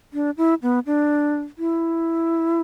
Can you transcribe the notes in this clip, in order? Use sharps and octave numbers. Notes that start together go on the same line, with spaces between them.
D4
E4
B3
D4
E4